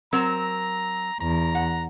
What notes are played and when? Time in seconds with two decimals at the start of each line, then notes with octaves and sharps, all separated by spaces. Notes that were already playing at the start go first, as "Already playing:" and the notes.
0.13 F#3 C4 A#4 A#5
1.21 E2 A#5
1.55 F#5